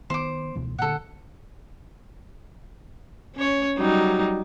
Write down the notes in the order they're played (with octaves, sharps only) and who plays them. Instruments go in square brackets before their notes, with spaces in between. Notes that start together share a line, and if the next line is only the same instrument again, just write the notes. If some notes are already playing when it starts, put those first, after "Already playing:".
[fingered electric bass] D#3 B3 [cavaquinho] C5 D6
[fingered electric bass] C#2 B2 E3
[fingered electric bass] A#2 D3 [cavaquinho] A4 F#5
[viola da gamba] C#4 C#5
F#3 G3 D#4